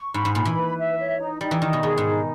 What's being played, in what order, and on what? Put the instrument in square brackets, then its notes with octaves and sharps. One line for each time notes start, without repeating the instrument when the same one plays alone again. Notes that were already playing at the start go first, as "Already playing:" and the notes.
Already playing: [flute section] C#6
[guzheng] G#2 [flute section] B5
[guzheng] G#2
[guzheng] A#2 [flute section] B5
[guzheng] E3
[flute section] B4
E5
C#5
D#4
[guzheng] G3 [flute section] D#4
[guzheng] E3
[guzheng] D#3 [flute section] D#4
[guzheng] B2
[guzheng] B2 [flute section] G#4
[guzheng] G#2
[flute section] D#4